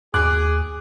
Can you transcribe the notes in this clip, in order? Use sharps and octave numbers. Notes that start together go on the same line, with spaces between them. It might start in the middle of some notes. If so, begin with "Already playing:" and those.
D#2 G#4 D6 F#6